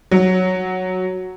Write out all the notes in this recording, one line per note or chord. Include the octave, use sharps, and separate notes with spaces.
F#3